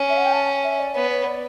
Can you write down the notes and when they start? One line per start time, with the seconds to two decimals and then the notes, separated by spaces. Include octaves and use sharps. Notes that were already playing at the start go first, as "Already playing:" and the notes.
Already playing: C#4
0.09 E5
0.17 F#5
0.25 G5
0.32 A5
0.63 E5
0.79 D5
0.95 B3 C#5
1.11 C#5
1.26 D5